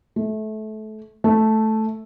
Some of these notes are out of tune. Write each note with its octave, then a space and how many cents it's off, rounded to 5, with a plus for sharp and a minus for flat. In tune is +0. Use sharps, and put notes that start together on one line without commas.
A3 -25
A3 -5